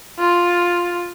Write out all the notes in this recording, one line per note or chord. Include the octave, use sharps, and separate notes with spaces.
F4